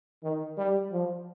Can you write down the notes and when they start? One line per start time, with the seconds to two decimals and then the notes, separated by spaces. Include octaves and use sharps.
0.24 D#3
0.58 G3
0.92 F3